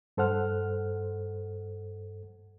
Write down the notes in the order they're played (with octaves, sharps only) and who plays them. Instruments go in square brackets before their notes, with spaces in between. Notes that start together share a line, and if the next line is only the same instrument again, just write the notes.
[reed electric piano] G2 A4 C5 F#5 F6